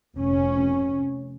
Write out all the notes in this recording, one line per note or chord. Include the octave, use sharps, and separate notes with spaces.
F1 C#4